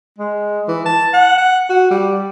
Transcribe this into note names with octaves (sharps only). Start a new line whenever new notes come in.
G#3
E3
A5
F#5
F#5
F#4
G3